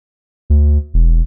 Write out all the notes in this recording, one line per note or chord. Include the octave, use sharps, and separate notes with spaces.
D2
E1